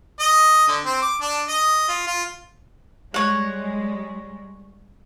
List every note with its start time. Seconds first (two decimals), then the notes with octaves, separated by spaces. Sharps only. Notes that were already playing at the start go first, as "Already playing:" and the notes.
0.20 D#5
0.68 D3
0.85 C4
1.02 D6
1.21 D4
1.48 D#5
1.88 F4
2.07 F4
3.14 G3 G#3 C#5 F#5